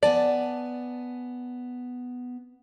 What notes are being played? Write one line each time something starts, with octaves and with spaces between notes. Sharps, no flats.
B3 D5 G#5 A5